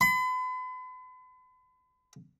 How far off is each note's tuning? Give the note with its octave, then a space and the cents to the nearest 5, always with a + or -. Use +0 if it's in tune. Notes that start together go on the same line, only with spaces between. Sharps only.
B5 +40